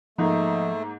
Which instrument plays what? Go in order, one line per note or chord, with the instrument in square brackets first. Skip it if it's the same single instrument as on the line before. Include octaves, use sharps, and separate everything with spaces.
[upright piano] G#2 A#3 [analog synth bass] F3 [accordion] A3 [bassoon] D#4